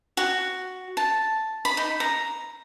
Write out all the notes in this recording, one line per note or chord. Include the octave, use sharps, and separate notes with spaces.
F#4
A5
B5
D#4
A#5